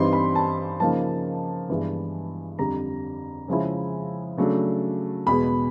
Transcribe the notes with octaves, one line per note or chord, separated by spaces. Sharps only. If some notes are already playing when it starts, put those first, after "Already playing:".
Already playing: G2 E3 G3 C4 D#4 C6
B5
A5
C#3 F3 A#3 D#4 A5
G2 E3 G#3 B3 E4
F2 D3 G3 A#5
C#3 F3 G#3 C#4 E4
C#3 F#3 A3 D4
E2 B2 G#3 B3 B5